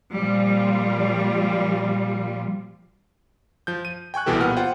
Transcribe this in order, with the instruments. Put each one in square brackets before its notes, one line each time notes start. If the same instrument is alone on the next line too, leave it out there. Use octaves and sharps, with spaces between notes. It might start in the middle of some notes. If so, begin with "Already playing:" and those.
[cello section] A#2 F3 G3 F4
[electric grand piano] F3 G6
D#7
G5 G#5 C#6 F#6
C2 B2 E3 G4 A4
A#2 B3 F#5 F6
F4 C5 F#5 G5